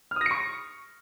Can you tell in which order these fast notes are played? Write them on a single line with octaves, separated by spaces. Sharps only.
F6 D#6 A#6 C#7 C#6